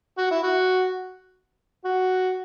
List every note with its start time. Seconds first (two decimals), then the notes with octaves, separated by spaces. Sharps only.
0.18 F#4
0.31 E4
0.43 F#4
1.85 F#4